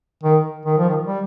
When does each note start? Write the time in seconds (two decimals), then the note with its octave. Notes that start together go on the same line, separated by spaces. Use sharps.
0.23 D#3
0.66 D#3
0.77 F3
0.89 D#3
1.07 G3